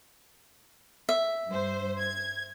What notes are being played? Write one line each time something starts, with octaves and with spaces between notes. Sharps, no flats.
E5
G2 C5
G#6